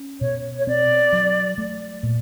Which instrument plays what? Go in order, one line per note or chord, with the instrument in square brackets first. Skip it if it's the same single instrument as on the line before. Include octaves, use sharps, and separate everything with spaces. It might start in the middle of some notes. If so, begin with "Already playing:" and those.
Already playing: [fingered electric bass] C#4
[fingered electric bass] B2 [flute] C#5
[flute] C#5
[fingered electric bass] C4 [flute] D5
[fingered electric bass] F#3
A3
A#2